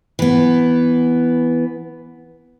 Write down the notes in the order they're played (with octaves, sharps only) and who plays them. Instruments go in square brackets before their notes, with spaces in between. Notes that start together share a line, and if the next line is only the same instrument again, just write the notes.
[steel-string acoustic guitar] E3 B3